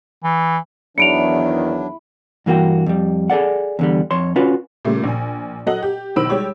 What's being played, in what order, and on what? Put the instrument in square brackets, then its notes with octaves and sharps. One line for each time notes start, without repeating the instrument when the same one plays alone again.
[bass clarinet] E3
[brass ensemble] E2 D#3 [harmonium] F#3 D4 [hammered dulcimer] E4 [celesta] C#7 D7 F7
[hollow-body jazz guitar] G2 E3 A#3 F#4 G5
F2 G3
G#4 A4 D5 F#5
E2 D3 G3
F2 C#5 C6
C#4 F4 F#4 B4
[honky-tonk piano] A#2 C#3 G3 A3
A#1 G#5
F#3 A4 D#5 F#5 F#7
G4
B1 D#3 C5 B5 E6 D7
G3 G#3 G4 C#5